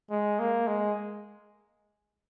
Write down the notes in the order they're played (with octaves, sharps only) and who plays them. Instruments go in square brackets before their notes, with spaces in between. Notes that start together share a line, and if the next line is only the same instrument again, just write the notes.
[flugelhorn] G#3
A#3
G#3